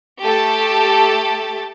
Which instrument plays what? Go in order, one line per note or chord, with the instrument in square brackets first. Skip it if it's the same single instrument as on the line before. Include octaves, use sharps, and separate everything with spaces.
[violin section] A3 G4 A4 A5 A6